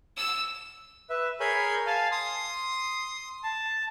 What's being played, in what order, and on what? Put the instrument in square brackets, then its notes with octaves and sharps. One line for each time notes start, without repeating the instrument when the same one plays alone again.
[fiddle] E6
[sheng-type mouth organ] B4 E5
G#4 A#4 C#5 G#5 B5 G6
F5 G#5 A5
C6 D#6
A5